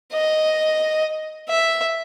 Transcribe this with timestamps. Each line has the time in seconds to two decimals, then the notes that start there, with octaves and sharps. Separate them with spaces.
0.13 D#5
1.49 E5